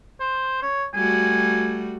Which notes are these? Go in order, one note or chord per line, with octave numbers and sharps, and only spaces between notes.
C5
C#5
G3 A3 F#4 G#5